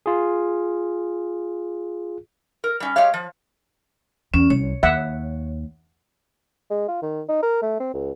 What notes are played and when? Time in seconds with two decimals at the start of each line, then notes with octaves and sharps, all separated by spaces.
0.06 F4 G#4
2.64 A#4
2.80 G3 C#4
2.96 G#3 G4 C#5 F5
3.14 F3
4.34 E2 C#4
4.50 C2 C#5
4.83 D#2 E5 F#5
6.70 G#3
6.88 F4
7.02 D#3
7.29 D#4
7.42 A#4
7.62 A3
7.80 C4
7.93 C#2